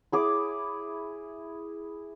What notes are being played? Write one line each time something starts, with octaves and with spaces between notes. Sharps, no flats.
E4 G#4 D6